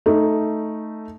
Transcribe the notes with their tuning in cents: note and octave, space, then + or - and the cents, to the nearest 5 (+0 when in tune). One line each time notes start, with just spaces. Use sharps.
A3 +0 D#4 +0